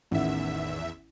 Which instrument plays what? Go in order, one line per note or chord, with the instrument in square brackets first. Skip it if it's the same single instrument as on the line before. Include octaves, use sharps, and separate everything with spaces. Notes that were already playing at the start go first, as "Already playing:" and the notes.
[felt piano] A1 D#3 F#5 [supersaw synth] E2 E5